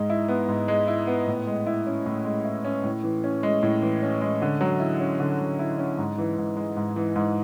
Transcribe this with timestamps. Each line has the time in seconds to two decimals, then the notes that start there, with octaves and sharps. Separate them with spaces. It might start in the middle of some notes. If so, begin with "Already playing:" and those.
Already playing: G#2 G#3
0.10 E4
0.28 B3
0.48 G#2
0.68 G#3
0.88 E4
1.07 B3
1.27 A2
1.47 G#3
1.66 E4
1.86 C#4
2.06 A2
2.25 G#3
2.45 E4
2.65 C#4
2.84 A2
3.04 E3
3.24 C#4
3.43 G#3
3.63 A2
3.82 E3
4.02 C#4
4.21 G#3
4.42 D3
4.61 F#3
4.80 E4
5.00 C#4
5.20 D3
5.39 F#3
5.59 E4
5.78 C#4
5.98 G#2
6.18 E3
6.38 G#2
6.57 G#3
6.77 G#2
6.96 E3
7.16 G#2